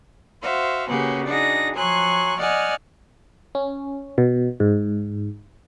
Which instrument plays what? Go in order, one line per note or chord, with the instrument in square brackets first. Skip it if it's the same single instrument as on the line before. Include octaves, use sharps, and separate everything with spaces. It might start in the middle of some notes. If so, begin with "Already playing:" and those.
[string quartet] F#4 C5 E5 F5
C#3 A#3 C#4 F#4 G4 B4
D4 D#4 F#4 G#4 A#6
F3 F#3 G#5 C6 C#6 F#6
D5 D#5 F#5 G#5 F6
[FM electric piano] C#4
B2
G#2